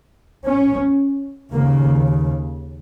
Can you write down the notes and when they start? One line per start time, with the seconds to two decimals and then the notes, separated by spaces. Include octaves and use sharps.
0.43 C#4
1.53 D#2 C#3 A#3